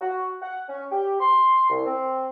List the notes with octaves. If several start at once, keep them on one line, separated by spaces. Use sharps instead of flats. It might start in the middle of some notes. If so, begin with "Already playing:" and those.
F#4
F#5
C#4
G4
C6
C2
C4